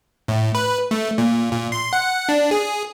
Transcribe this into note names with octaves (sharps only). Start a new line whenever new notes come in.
A2
B4
A3
A#2
A#2
C6
F#5
D4
G#4